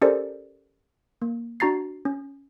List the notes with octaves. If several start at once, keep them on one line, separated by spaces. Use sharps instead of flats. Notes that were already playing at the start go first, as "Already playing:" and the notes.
C#4 G4 A4 A#4 C5 D5
A#3
D4 F#4 A#5 A6 C7
C#4